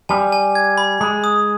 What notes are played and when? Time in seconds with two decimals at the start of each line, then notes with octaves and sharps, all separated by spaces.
0.09 G3 G#5
0.32 G#5
0.55 G#6
0.78 B5
1.01 G#3 B5
1.24 D#6